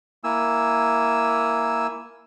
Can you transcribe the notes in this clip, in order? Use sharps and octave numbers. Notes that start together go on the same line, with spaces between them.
A#3 E4 G#5 E6